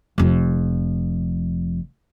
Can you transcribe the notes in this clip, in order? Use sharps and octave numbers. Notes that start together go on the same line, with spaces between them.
F1 F2